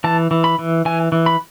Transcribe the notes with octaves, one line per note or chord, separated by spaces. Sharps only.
E3 A5
E3
B5
E3
E3 G#5
E3
B5